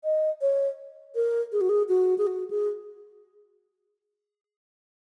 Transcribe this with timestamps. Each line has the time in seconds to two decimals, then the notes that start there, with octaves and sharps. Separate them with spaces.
0.04 D#5
0.41 C#5
1.15 A#4
1.52 G#4
1.61 F#4
1.69 G#4
1.89 F#4
2.18 G#4
2.27 F#4
2.50 G#4